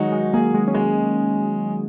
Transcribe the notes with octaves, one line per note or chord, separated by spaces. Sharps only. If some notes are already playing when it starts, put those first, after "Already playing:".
Already playing: D#3 F#3 G#3 D#4 F#4
G#3
A#3 G#4
G#3
C#4
G#3 A#3